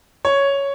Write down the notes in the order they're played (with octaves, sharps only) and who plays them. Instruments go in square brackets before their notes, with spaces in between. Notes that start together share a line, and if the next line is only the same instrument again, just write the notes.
[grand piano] C#5